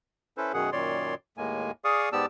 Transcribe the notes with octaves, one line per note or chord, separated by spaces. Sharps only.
C#4 E4 A4 B4 C5
F#2 B2 D#3 G#4 F#5
F#2 A#2 D#3 C#5 D5 C6
D#2 A2 G#3 A#3 G#5
G#4 D5 F5 C#6 D#6
G#2 B3 G4 D5 A5 E6